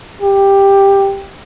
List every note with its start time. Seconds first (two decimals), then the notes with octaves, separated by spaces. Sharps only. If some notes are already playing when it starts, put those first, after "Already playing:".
0.22 G4